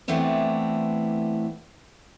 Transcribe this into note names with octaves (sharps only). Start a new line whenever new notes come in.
E3 A3 B3 C4 D4 E4